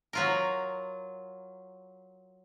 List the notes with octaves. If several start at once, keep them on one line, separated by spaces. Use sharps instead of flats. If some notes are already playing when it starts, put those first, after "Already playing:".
F#3 F4 A#4